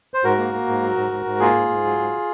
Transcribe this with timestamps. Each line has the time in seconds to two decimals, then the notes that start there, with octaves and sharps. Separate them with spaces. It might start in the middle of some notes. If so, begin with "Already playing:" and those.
0.14 C5
0.24 G#2 F#4 A#4
0.38 A#3
0.53 A#3
0.68 G#2
0.82 F#3
0.96 G#2
1.11 G#2
1.25 G#2
1.40 A#3 F4 G#4
1.55 G#2
1.69 G#2
1.84 F#3
1.99 G#2